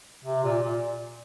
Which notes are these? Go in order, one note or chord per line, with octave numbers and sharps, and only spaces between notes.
C3
A#2
A#2